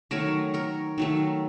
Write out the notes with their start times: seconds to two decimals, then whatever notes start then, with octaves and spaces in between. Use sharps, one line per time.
0.11 D#3 F#3 A3 A#4 C#5
0.54 A#4 C#5
0.98 D#3 F#3 A3